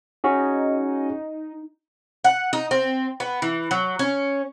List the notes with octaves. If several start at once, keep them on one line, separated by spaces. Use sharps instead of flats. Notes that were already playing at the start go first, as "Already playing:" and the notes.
C#4 D#4 F#4 G#4
F#5
D#4
C4
B3
E3
F#3
C#4